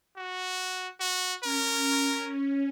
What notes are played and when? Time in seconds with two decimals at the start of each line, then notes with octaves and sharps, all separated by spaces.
0.17 F#4
1.00 F#4
1.44 C#4 A#4